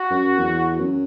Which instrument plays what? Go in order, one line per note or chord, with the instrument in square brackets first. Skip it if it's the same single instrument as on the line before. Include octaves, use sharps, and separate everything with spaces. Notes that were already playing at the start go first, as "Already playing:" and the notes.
Already playing: [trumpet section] F#4
[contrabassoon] F#2
E2
F#2